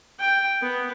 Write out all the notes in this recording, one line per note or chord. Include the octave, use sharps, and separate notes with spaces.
G5
B3